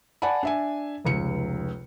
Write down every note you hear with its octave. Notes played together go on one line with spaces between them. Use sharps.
D5 F#5 G#5 A5 B5
D4 E5 G#5
F1 C#2 C#7